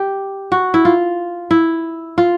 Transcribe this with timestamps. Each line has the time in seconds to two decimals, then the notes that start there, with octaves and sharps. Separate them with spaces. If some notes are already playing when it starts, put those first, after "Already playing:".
Already playing: G4
0.52 F#4
0.74 E4
0.85 F4
1.51 E4
2.18 F4